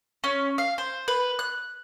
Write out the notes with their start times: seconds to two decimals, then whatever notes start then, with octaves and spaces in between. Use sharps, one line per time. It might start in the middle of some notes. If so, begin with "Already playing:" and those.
0.24 C#4
0.58 F5
0.78 C5
1.08 B4
1.39 F#6